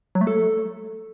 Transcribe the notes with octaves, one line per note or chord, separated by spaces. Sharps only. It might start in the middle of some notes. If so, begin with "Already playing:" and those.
F#3
A3
A4